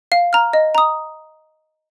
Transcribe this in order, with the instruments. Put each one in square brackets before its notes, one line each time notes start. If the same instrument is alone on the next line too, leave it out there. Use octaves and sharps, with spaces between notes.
[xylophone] F5
A#5 F6
D#5
A#5 D#6